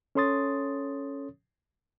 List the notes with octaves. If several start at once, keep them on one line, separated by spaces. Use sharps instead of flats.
C#4 A4 C#5 C6 D#6 A6